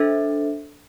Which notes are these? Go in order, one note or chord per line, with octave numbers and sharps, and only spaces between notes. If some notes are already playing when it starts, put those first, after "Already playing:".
Already playing: D4 A4 C5 E5